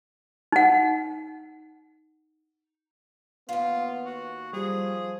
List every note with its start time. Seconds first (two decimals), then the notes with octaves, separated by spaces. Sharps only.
0.52 D#4 F#5
3.49 D#2 B3 F4 F5
4.05 F#4
4.53 F3 G3 G#4